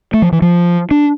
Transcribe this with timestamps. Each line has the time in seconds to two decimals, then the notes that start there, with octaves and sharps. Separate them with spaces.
0.14 A3
0.22 F3
0.32 E3
0.42 F3
0.91 D4